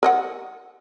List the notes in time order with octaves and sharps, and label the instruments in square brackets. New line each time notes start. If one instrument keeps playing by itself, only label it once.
[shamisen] A#4 D#5 F#5